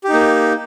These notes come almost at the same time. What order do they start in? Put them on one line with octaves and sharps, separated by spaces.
G4 D#4 A#3